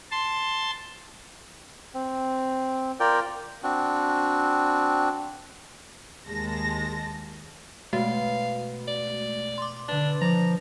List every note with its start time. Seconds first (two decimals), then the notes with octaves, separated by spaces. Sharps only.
0.11 A5 C6
1.94 C4
3.00 F4 A#4 D5 G5
3.63 C4 D4 F#4
6.27 D#2 G#3 A5 A#6
7.93 B2 G#3 A3 F#4 F5
8.88 D5
9.58 C6 D6
9.88 D3 D4 B4
10.21 F3 D5 A#5